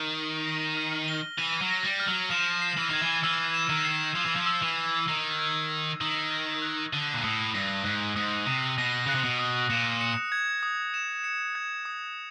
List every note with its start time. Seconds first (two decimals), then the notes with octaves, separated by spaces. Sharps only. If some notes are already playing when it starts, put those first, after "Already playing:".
Already playing: D#3 G7
0.15 D#7
0.46 A#6
0.77 F6
1.08 G7
1.38 E3 D#7
1.62 F#3
1.69 A#6
1.84 G3
2.00 F6
2.08 F#3
2.31 F3 E7
2.62 C7
2.77 E3
2.90 D#3 G#6
3.02 E3
3.23 E3 E6
3.54 E7
3.69 D#3
3.85 C7
4.15 F3 G#6
4.26 E3
4.36 F3
4.46 E6
4.62 E3
4.77 E7
5.08 D#3 C7
5.39 G#6
5.70 E6
6.01 D#3 D#6
6.32 A#6
6.62 F#6
6.93 D3 D#6
7.14 A#2
7.24 A2 D#6
7.54 G2 A#6
7.85 G#2 F#6
8.16 G#2 D#6
8.47 C3 D#6
8.78 B2 A#6
9.06 C#3 F#6
9.15 C3
9.24 B2
9.39 D#6
9.70 A#2 E7
10.01 C#7
10.32 G#6
10.63 D#6
10.94 E7
11.24 C#7
11.55 G#6
11.85 D#6